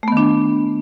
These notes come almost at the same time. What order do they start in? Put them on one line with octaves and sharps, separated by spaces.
A3 B3 D#3 D4